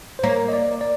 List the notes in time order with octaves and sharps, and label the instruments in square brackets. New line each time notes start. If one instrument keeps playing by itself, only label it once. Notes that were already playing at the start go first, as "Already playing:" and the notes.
[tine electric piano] C5
[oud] A#3 [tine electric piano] C#5
[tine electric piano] D#5
D5
D5